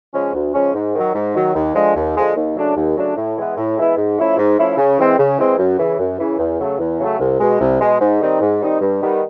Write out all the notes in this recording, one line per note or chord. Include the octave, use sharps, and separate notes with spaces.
C#3 F3 G#3 C#4
D2
C#3 F3 G#3 C#4
G#2
D#3 F#3
G#2
D#3 F#3
D#2
D3 F3 G#3
D#2
D3 F3 G#3
D#2
C#3 F#3 A3 D4
D#2
C#3 F#3 A3 D4
A2
E3 G#3 B3 E4
A2
E3 G#3 B3 E4
G#2
F3 A3 C#4 E4
G#2
F3 A3 C#4 E4
C#3
E3 G#3 C4
C#3
E3 G#3 C4
F#2
C#3 E3
F#2
C#3 E3
E2
C#3 F#3 A3
E2
C#3 F#3 A3
C2
B2 G#3
C2
B2 G#3
G#2
D#3 G3 C4 D#4
G#2
D#3 G3 C4 D#4
G2
D#3 G3 B3